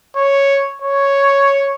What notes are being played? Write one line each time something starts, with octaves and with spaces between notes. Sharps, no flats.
C#5
C#5